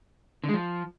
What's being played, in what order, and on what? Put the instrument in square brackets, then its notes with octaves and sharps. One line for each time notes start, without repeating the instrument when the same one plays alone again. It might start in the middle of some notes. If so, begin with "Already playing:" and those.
[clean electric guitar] D3
G#3
F3